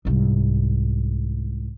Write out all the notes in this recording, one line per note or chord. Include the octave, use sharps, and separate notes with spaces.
C2 G#2